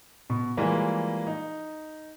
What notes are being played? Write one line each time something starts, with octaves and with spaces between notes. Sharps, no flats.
B2
E3 F3 G3 G#3 A#3
D#4